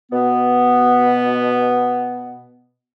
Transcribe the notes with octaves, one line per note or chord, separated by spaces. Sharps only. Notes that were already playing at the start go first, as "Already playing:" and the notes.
B2 B3